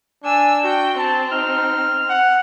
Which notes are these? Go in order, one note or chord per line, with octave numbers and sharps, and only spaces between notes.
D4 G#5 E6
F#4 G5
C4 A5
D#4 F6
F#5